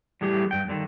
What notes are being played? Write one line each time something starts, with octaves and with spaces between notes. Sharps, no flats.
A2 E3 G3 G4 G#4
G2 G5
G2 D3 D#3